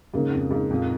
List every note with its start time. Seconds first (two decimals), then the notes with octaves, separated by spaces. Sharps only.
0.13 G#2 C#3 A#3 C#4 A#4
0.32 F2
0.51 G#2
0.70 F2 A#2 A#3 F4